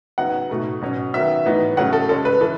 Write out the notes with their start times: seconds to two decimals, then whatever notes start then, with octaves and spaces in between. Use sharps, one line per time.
0.18 C#3 F#3 B3 D#4 F#5
0.49 B2 A3 D#4
0.81 B2 F#3 C#4
1.14 D#3 F#3 B3 E5
1.46 A2 E3 B3 D#4
1.77 C#3 F#3 A3 C#4 F#5
1.93 A4
2.09 C#3 G#3 C#4 A4
2.25 B4
2.41 E3 A4